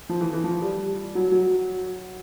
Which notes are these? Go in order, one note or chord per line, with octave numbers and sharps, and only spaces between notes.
F3
E3
E3
F3
G3
F#3
F#3